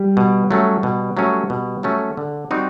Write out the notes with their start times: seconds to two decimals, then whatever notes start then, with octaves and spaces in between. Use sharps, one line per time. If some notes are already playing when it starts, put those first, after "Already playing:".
Already playing: G3
0.17 B2
0.51 F#3 A3 C#4
0.83 B2
1.17 F#3 A3 C#4
1.50 B2
1.83 F#3 A3 C#4
2.17 D3
2.51 G3 C4 D#4 F#4